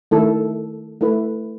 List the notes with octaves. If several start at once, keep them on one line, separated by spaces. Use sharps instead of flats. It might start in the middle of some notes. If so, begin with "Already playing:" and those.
D#3 A3 E4 A4
A3 E4 B4